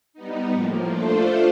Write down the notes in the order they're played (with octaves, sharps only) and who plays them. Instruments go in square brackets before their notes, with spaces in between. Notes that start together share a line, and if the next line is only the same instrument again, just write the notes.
[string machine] G3 B3 D#4
A2 F3 A#3
A3 D4 F4 A4 C5